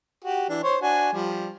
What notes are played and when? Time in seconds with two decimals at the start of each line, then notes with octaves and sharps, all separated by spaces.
0.25 F#4 G4
0.49 E3 D4
0.64 C5 C#5 C6
0.82 D4 F#4 G#5
1.13 F3 G3